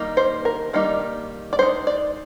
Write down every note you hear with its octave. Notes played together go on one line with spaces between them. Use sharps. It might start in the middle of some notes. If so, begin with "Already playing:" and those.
Already playing: D#3 G3 A#3 D#4
C5
A#4
D#3 G3 A#3 D#4
D5
G#3 D#4 C5
D5